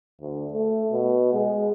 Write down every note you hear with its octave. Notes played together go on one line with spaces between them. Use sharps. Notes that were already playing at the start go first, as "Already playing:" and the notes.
D2
A3
B2
G#3